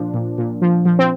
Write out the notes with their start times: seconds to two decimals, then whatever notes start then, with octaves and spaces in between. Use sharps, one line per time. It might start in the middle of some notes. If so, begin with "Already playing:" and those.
Already playing: A#2 F3 D4
0.14 A#2
0.38 A#2
0.62 F3
0.85 F3
0.99 C4